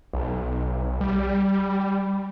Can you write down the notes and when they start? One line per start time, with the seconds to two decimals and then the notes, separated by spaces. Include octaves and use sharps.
0.13 B1
1.01 G3